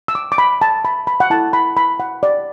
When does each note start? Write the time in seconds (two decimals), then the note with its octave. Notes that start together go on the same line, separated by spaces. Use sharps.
0.08 E6
0.15 D6
0.32 D6
0.38 B5
0.61 A5
0.85 B5
1.07 B5
1.20 F#5
1.30 E4 A4 A5
1.53 B5
1.77 B5
2.00 F#5
2.23 D5